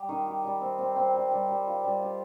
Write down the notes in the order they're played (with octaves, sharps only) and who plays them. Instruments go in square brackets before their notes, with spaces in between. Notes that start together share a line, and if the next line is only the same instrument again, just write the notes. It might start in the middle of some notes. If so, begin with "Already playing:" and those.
Already playing: [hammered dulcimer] G3 G4
D#3
G4
G3
C4
C4
C4
G3
G3
G3
F4
G3
G4